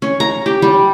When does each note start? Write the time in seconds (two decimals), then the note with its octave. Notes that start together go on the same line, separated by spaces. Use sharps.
0.02 C#4
0.20 A#5
0.46 G4
0.62 G3